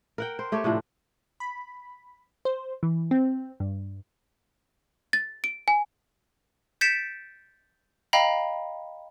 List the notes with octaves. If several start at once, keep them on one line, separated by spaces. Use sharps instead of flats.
A#4 F#5 G5
C5
A3 G4 A4 C#5
A2 C3 F3 D4
B5
C5
E3
C4
G2
A6
D7
G#5
G6 A6 B6 C#7 D7 E7
D#5 F5 G5 A#5 B5